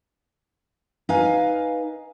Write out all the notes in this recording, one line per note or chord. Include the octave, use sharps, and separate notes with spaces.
D#4 B4 F5 G#5